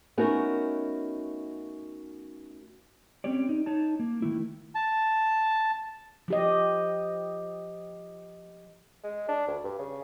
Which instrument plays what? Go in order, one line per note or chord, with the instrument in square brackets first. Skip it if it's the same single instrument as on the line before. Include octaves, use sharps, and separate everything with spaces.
[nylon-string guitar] A3 B3 C#4 D#4 F#4 A#4
[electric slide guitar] C4 C#4 G4 C#5 D5
D#4
D#4 C#5 A5
A#3
D#3 A3 E4
[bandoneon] A5
[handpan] F3 G4 D#5
[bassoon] G#3
D4
D2
G2
C#3